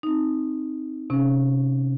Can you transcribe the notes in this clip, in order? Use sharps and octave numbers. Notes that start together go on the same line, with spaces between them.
C4 D#4
C3 C#4